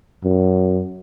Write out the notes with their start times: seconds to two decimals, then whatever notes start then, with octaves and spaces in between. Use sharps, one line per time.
0.24 F#2